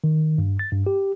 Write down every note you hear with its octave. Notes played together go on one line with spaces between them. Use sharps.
D#3
G2
A6
G2
G4